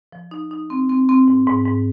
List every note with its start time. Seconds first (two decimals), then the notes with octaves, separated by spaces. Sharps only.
0.12 F3
0.31 D#4
0.51 D#4
0.70 C4
0.89 C4
1.09 C4
1.28 G#2
1.47 G#2
1.66 G#2